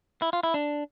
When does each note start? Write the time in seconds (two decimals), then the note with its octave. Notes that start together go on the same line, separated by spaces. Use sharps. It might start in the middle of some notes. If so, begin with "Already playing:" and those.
0.22 E4
0.33 F4
0.43 E4
0.54 D4